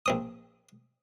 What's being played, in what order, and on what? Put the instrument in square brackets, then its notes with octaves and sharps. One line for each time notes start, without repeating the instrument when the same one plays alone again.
[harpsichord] A#1 C4 D#6